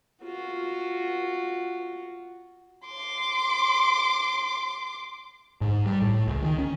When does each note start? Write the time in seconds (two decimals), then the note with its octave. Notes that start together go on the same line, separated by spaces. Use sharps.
0.23 F4 F#4
2.87 C6 D6
5.61 G#2
5.86 G3
6.02 A2
6.28 C#2
6.43 D#3
6.58 C#4